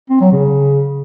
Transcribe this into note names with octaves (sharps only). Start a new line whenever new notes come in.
C4
F#3
C#3